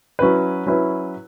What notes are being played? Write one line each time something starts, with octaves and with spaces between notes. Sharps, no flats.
F#3 C#4 E4 B4
F#3 C#4 E4 B4